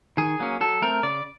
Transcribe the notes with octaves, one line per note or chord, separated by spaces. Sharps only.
D#3 G#4
F#3 A#3 C#4
F#3 A4
A3 C4 A#4
C#3 D5